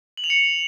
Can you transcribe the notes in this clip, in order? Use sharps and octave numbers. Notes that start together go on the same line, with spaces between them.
F#7
F7
C#7